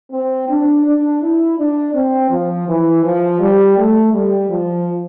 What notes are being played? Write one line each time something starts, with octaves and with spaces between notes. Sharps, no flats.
C4
D4
D4
E4
D4
C4
F3
E3
F3
G3
A3
G3
F3